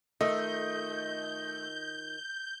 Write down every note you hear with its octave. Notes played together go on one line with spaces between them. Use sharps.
D#3 A3 F4 D#5 G6